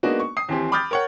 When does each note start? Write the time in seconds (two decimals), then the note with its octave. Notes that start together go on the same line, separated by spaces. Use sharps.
0.03 G#3 A#3 B3 D4 D#4 F#4
0.20 C#6
0.37 D#6 C7
0.49 D#2 E3 C4 G4
0.72 B5 D6 D#6 F6 G6 A6
0.91 A#4 C#5 F#5